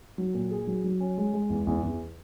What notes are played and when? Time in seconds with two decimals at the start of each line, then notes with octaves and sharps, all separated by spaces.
0.18 F#3
0.34 A#2
0.51 G#4
0.67 F#3
0.84 F#3
1.00 C#4
1.18 G#3
1.33 G#3
1.50 E2
1.67 E2
1.83 E2